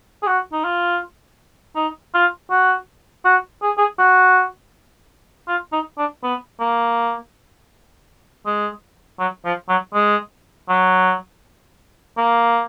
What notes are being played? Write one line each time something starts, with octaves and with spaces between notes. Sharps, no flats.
G#4
F#4
D#4
F4
D#4
F4
F#4
F#4
G#4
G#4
F#4
F4
D#4
D4
B3
A#3
G#3
F#3
F3
F#3
G#3
F#3
A#3